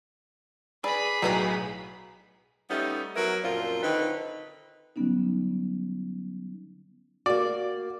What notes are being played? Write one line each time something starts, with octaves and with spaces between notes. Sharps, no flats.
G#4 B4 D5 B5
B1 A2 D#3 F#3 B4 A#5
G3 A3 B3 C#4 D#4
F#3 B3 E4 A4 A#4
F#2 A#2 F3 C4 F4
D3 D#3 C4 D#4 B4
D3 F#3 G3 B3 C#4 D#4
A#3 F#4 D5